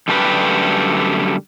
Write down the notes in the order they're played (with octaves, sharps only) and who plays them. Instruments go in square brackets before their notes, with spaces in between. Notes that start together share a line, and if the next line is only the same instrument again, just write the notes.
[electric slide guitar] F#2 D3 G3 A3 G4 B4